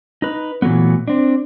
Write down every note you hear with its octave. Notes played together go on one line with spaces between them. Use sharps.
D#4 B4
A#2 E3 F#3 A3 B3
C4 D4